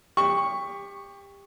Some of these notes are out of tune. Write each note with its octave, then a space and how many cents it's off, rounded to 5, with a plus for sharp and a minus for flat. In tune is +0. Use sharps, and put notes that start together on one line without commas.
G4 +25 C#6 +0